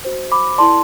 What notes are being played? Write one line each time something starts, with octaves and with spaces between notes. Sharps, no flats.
F#4 C5
B5 D6
E4 A4 D5 A5 C6